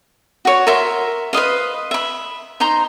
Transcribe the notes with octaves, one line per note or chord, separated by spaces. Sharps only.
F#4 C#5
A#4 E5 C6
B4 C5 D#5 F5
E5 B5
D#4 C5 A#5 C6